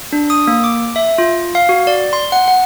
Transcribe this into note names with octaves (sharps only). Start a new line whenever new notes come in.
D4
D#6
A#3
D6
E5
F4
F5
F#4
D5
C6
F#5
F#5